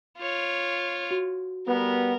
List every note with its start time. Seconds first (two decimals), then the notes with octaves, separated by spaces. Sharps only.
0.18 F4 C#5
1.11 F#4
1.68 G3 B3 A#4